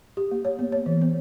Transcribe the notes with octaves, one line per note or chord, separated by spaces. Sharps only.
G4
A#3
C#5
B3
C#5
E3
B3